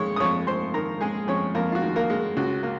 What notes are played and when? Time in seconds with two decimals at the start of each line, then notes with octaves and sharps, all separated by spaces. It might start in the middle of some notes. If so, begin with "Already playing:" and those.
Already playing: F2 D#3 G#3 C#5 C#6
0.16 D#6
0.20 F2 C#5 C#6
0.47 F2 C5 C6
0.74 D#3 A#4 A#5
1.01 G#3 G#4 G#5
1.28 F2 C#4 C#5
1.55 F2 A#3 A#4
1.72 F4
1.75 F#4
1.82 D#3
1.96 A#3 A#4
2.10 G#3
2.37 C#2 F#4
2.63 A#3